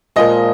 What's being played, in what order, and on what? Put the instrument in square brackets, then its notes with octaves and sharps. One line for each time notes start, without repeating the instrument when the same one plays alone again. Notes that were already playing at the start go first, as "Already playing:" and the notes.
[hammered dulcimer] A#2 F3 G#3 [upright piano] D#5